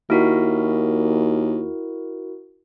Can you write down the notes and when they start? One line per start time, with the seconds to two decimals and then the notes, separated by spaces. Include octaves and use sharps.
0.10 D#2 E4 F#4 A#4